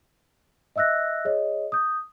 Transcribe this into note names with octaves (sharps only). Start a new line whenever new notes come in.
D#5 E5 E6 F#6 A#6
G#4 C#5 D#5
D#6 G6